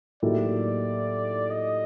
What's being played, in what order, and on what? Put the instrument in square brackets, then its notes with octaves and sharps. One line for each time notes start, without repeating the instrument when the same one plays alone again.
[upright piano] A2 F#3 A#3 D#4 G4 [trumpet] D5
[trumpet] D#5